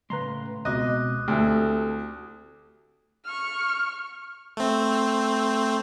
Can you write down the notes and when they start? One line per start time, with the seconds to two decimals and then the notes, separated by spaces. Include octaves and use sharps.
0.10 A2 C#3 G#3 B4 A#5 C6
0.65 C#2 B2 G#3 C4 D#5 D6 D#6 F#6
1.28 D2 C4 E4 F#4 G4 A4
3.25 C#6 F6
4.57 A3 C4